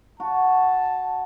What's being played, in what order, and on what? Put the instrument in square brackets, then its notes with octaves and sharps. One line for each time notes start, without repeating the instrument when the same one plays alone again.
[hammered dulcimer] F#4 [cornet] A5